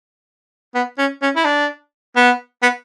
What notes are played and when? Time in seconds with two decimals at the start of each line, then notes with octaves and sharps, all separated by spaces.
0.75 B3
0.98 C#4
1.22 C#4
1.36 E4
1.45 D4
2.16 B3
2.63 B3